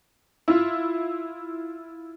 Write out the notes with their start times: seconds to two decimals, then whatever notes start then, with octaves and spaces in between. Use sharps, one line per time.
0.48 E4 F4